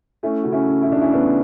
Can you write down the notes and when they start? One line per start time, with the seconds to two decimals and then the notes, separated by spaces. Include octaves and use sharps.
0.23 A3 C#4 E4
0.43 C#3 F#4
0.52 C#4 E4
0.67 C#3
0.82 E4
0.90 C#3 D4
1.01 C#4 E4
1.13 C#3 B3 D4